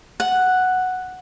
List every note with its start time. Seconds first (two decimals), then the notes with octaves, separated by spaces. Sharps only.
0.20 F#5